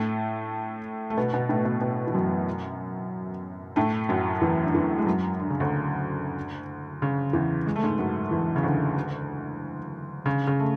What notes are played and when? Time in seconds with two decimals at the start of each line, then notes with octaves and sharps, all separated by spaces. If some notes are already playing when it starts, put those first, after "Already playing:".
Already playing: A2 A3
1.10 A3
1.17 B2 B3
1.33 B2 B3
1.49 A2 A3
1.65 B2
1.81 B2
2.07 E3
2.14 F#2 F#3
3.76 A2 A3
4.09 F#2 F#3
4.41 E2 E3
4.63 D3
4.75 E2 E3
4.98 G#3
5.06 F#2 F#3
5.40 D3
5.50 C#3
5.60 D2 D3
7.02 C#3
7.33 E2 E3
7.67 G#3
7.76 A3
7.83 G#2 G#3
7.98 F#2 F#3
8.31 E2 E3
8.56 C#3
8.63 D2 D3
10.26 C#3
10.47 C#3
10.60 A3